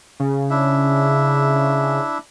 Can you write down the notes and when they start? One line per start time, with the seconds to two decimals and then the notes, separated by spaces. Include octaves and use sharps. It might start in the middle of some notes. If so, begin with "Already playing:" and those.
0.20 C#3
0.50 D4 E4 E5